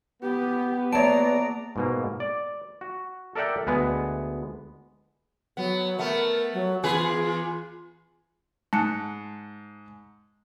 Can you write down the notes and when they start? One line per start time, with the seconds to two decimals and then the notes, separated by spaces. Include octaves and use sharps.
0.23 B3 G4
0.93 A#3 C#5 D5 A5 A#5 D7
1.76 G#2 B2 A#3
2.20 D5
2.81 F#4
3.35 A4 A#4 D5 E5 F#5 G5
3.67 D2 G#3 B3
5.57 F#3 B3
5.99 A3 B3 A#4
6.54 F#3
6.84 E2 F4 G#4 B4
8.73 G#2 A5 F#6 C#7